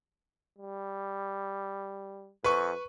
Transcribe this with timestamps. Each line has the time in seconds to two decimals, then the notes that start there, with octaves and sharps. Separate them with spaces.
0.59 G3
2.44 F2 B4 C#6